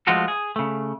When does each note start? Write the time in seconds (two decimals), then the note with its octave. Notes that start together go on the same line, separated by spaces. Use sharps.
0.07 F3 G#3 A3 F4 F#4 A4
0.28 G#4
0.56 C#3 A3